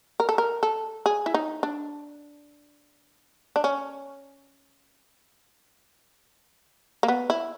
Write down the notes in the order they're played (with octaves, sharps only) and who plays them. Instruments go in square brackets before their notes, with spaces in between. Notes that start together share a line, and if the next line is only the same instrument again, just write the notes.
[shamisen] A#4
A4
A#4
A4
G#4
E4
D#4
D4
D4
C#4
A#3
B3
E4